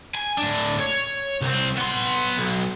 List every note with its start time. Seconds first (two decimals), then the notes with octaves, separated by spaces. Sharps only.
0.15 G#5
0.38 A2 D4
0.80 C#5
1.41 C2 C4
1.77 B3 C6
2.38 B1